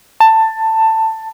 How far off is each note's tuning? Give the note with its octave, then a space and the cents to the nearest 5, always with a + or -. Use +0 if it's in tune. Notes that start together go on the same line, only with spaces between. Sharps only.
A5 +15